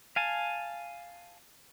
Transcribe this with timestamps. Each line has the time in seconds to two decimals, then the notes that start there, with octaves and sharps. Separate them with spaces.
0.16 F5 G#5 A5